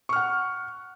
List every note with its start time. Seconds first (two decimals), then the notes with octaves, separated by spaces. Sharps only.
0.09 C#6
0.13 F6
0.16 F#5